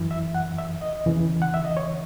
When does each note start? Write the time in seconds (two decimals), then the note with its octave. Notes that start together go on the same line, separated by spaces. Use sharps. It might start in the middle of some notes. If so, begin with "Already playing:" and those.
Already playing: F#2 E3
0.11 E5
0.35 F#5
0.59 E5
0.81 D#5
1.06 E2 C#3 E3
1.42 F#5
1.54 E5
1.65 D#5
1.77 C#5